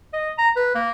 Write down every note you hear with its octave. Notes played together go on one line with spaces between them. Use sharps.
D#5
A#5
B4
A#3